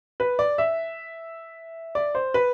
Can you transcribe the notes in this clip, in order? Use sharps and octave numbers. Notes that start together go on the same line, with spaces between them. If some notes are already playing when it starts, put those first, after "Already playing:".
B4
D5
E5
D5
C5
B4